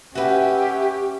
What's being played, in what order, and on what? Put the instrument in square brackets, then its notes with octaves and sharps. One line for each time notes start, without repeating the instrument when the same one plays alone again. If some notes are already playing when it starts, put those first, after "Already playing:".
[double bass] C#4 [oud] F#4 B4 [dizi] G4 [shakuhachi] E5